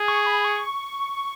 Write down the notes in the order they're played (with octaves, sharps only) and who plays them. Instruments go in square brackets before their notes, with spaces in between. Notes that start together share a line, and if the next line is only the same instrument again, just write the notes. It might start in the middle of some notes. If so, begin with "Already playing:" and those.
Already playing: [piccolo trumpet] G#4
[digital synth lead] C#6
B5
C#6